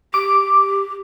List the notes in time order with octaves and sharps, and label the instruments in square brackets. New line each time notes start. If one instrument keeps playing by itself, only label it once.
[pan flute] G4 [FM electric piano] D6